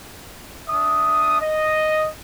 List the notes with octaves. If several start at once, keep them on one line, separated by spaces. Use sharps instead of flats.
D4 E5 D#6
D#5